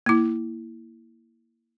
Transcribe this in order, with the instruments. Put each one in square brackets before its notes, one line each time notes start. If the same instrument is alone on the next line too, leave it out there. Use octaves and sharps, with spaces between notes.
[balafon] A#3 E4